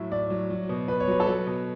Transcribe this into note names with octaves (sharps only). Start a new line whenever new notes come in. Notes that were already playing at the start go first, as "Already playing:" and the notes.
Already playing: A2 F#3 E5
A2 D5
F#3
F#3
B2
B2 B4
C#5
F#3 B4
A4
F#3 B4
B2